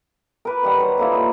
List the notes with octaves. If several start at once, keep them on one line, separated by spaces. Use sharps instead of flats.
A#4 B4 D6
D#3 G3 F#5
F#4 A#4 C5 C#5
D3 A#3 E4 F4
D#3 D#4